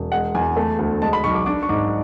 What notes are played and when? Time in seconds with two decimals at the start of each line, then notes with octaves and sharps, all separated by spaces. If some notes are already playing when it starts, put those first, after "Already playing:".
Already playing: E1
0.12 G#3 F#5
0.35 E2 G#5
0.57 A3 A5
0.79 D2
1.02 G#3 A5
1.13 B5
1.24 B1 C#6
1.35 D6
1.46 D4 D6
1.63 C#6
1.69 G#2 D6